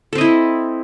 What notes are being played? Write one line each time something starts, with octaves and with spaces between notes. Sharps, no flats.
C4 E4 A4 D#5